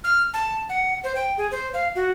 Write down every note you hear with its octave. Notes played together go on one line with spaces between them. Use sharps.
F6
A5
F#5
C5
G5
G#4
C5
F5
F#4